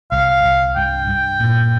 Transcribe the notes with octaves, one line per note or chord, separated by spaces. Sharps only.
C2 F5
C2
G2 G5
G2
A#2